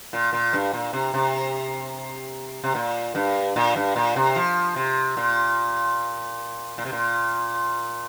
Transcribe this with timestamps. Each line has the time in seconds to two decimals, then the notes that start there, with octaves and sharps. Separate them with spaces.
0.13 A#2
0.33 A#2
0.53 G2
0.73 A#2
0.93 C3
1.14 C3
2.64 C3
2.75 A#2
3.15 G2
3.56 A#2
3.76 G2
3.96 A#2
4.16 C3
4.36 F3
4.76 C3
5.17 A#2
6.78 A#2
6.85 C3
6.92 A#2